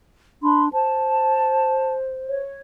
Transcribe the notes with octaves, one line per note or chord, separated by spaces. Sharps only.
D4 B5 C6
C5 A5
C#5